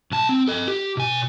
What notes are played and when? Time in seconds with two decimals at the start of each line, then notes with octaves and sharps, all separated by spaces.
0.11 B1 A5
0.29 C4
0.48 A4 D#5
0.68 G4
0.97 B2 G#5